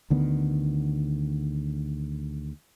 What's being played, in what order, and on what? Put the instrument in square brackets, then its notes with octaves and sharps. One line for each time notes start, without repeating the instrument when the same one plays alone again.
[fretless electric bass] D2 D3 D#3 B3